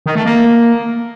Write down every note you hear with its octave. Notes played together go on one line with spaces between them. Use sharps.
D#3
A3
A#3